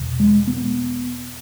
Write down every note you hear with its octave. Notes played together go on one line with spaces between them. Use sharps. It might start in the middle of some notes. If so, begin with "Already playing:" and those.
Already playing: E2 B2
G#3
B3